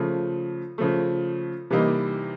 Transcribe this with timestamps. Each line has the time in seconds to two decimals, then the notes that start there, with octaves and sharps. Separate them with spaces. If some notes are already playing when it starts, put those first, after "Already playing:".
Already playing: C#3 F3 A3
0.78 C#3 F3 A3
1.70 C3 E3 G3 A#3 D#4